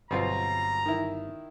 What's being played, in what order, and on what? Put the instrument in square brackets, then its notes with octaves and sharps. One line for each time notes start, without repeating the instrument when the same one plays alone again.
[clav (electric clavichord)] G1 F#3 F4 [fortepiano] B2 C4 [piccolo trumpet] A#5
[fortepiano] D#3 E4